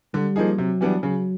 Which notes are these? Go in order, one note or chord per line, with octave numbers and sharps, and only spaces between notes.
D3 G3
F3 A#3 D#4 G#4
C3 F#3
E3 G3 B3 D4
C#3 F#3